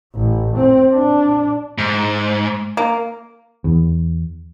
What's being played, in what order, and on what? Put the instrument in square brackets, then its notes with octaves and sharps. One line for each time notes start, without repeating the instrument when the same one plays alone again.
[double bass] A1
C4
D4
[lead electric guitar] G#2
[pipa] A#3
[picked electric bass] E2